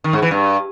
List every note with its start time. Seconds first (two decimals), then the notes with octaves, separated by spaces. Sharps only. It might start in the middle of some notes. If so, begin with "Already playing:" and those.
0.04 D#3
0.13 G#2
0.22 E3
0.31 G2